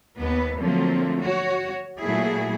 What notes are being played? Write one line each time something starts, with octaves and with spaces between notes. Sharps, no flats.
D#2 B3 B4
D3 F3 F#3 A3 A#3 C4
F#4 C#5
A#2 F#3 A3 E4 F#4 G#4